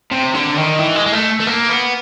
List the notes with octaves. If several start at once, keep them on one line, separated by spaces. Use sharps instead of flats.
C3
D3
D#3
E3
G#3
G#3
A3
A3
A#3
B3